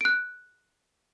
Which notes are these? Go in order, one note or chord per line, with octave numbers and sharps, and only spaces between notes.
F#6 D7